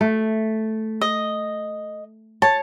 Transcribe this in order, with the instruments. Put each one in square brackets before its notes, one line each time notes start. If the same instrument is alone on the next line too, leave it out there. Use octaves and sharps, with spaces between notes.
[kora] A3
[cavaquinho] D#5
[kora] C#5 [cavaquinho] A5